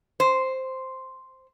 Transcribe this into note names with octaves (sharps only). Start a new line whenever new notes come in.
C5